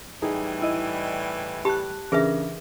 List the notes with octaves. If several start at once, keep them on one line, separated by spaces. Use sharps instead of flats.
A2 E3 G3 D#4 G#4
E4 D#5
G4 A5 B5 F#6
C#3 E3 D4 G#4 A#4 B4 E5